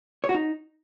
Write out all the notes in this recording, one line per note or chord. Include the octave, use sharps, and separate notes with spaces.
C#5
F#4
D#4